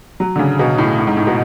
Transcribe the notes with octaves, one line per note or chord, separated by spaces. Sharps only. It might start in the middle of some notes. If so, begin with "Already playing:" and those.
F#3
D3
C#3
B2
A2
A2
G#2
A2
B2